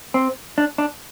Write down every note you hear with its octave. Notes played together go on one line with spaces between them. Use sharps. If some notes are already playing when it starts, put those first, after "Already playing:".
C4
D4
D4